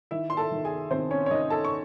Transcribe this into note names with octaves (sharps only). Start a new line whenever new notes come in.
D#3 E4 E5
C6
A4 A5
D#3
G#4 G#5
D#3 C4 C5
C#4 C#5
C#5
D#3 D#4 D#5
A4 A5
C#6